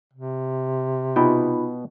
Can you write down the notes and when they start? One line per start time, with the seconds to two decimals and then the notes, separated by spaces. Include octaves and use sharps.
0.13 C3
1.16 B2 B3 D#4 F4 G5 B5